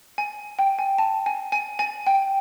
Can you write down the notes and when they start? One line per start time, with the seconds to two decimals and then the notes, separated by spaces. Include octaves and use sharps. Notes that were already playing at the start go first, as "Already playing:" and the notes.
0.18 G#5
0.59 G5
0.79 G#5
0.98 A5
1.26 G#5
1.52 G#5
1.79 G#5
2.07 G5